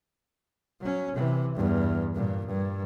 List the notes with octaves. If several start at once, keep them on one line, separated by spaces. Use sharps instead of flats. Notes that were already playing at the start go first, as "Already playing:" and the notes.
F#3 C#4
C3 E3
E2 G2
G2 A#2
G2